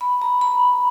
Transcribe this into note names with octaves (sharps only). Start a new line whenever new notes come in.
B5
A#5
B5